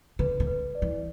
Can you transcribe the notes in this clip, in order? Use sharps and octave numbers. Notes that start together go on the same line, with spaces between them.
D3 B4
D3
B4
D5
E3